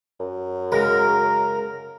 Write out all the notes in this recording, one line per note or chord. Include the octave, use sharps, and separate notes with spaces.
F#2
C#3 G#3 A#4